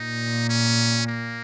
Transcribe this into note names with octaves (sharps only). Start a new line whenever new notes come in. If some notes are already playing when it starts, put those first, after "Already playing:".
Already playing: A#2 D#4
C#4
A#3